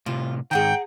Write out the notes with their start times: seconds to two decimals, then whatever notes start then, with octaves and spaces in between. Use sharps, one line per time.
0.06 A2 C3 F4
0.51 G#2 D#3 G#4 F#5 G5 A#5